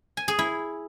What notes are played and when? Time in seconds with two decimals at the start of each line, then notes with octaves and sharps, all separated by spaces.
0.17 G#5
0.28 G#4
0.39 E4